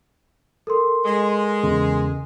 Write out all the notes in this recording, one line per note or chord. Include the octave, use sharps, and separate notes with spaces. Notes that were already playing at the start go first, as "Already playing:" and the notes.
A4 A#4 C6
G#3
E2 C#3